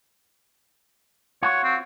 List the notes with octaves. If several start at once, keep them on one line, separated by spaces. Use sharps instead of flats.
F4 F#4 C#5
C4